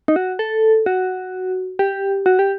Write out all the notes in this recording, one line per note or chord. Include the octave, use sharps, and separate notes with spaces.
D#4
F#4
A4
F#4
G4
F#4
G4